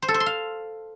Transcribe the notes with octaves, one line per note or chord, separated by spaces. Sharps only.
C5
A4
C5
C6
F5